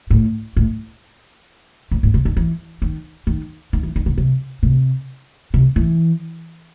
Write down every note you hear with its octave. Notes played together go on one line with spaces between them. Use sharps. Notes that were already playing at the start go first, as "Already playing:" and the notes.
A2
A2
A2
A2
C3
D#3
E3
D#3
D#3
D#3
E3
D#3
C#3
C3
C3
C3
E3